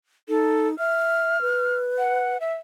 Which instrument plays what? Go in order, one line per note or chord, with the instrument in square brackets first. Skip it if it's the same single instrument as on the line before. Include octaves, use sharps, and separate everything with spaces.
[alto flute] D#4 [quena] A4
[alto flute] E5 [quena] F6
[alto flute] B4
[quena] F#5
E5